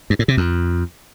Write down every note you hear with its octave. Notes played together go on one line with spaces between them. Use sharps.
G2
A2
C3
F2